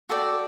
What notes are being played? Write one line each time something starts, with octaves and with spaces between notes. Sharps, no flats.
F#4 A4 D5 G5